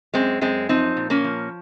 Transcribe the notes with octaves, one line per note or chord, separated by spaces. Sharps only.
F#2 G#3 C4
F#2 G#3 C4
F3 C4 D#4
A#2
A#3 C#4
F3